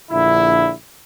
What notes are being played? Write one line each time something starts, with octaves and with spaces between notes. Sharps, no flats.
A#1 D3 E4